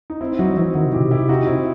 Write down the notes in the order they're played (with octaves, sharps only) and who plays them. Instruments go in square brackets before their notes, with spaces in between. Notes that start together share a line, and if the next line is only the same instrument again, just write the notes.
[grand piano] D#4
C4 E4
[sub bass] F#3 [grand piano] D#4 F#4
[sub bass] F#3
[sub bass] E3 [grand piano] C4 E4
[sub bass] D#3 [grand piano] D#4 F#4
[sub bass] C3
[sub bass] B2 [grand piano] E4 G4
[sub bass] C3
[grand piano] E4 G4
D#4 F#4
C4 E4